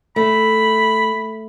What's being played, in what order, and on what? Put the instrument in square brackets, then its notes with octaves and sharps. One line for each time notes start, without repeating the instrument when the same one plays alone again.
[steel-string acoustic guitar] A3 [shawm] B5